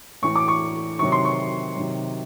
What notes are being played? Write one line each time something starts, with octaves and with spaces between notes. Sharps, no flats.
A2 E3 C#6
D6
C#6
C3 D#3 F#3 C#6
C6
C#6
C3 D#3 F#3